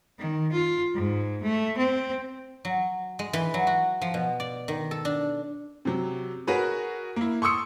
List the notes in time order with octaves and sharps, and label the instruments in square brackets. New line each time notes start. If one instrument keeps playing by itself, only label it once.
[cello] D#3
F4
G#2
A3
C4
[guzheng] F#3
G#3
E3
F#3
F#4
F3
B2
D5
D#3
A4
D4
[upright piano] C3 F#3
F#4 G#4 A#4 B4 C#5
A#3 E4
C6 C#6 D#6 E6 C#7